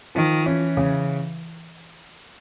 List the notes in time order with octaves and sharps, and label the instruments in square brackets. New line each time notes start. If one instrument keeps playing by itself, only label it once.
[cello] D#3 [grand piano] F3
[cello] E3 [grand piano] C#4
[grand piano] C#3